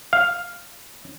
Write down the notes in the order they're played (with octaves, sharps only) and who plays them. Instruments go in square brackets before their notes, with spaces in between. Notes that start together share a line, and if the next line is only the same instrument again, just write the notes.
[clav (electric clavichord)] F5